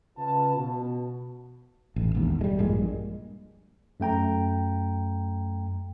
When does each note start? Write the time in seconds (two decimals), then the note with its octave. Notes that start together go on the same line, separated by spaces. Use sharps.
0.18 C#3 F4 B4 A5
0.57 B2
1.96 A1
2.15 E1 D#2
2.41 G3 G#3
2.59 A#1 G2 A#2 G#3
4.00 F#2 A3 G5 A#5